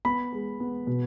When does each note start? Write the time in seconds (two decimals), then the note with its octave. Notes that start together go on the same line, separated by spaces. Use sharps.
0.05 B3 B5
0.32 G#3
0.60 B3
0.87 B2